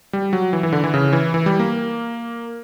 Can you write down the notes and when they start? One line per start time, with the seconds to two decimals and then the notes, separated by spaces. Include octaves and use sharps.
0.13 G3
0.33 F#3
0.53 E3
0.63 E3
0.72 D3
0.84 E3
0.94 C#3
1.13 E3
1.34 E3
1.46 G3
1.59 A#3